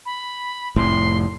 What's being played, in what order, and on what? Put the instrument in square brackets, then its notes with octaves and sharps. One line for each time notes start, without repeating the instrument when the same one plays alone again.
[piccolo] B5
[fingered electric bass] F1 A2 [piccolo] C6